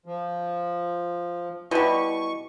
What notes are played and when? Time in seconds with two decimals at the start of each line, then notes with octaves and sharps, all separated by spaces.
0.06 F3
1.71 B2 G3 E4 D#5 C#6 D#7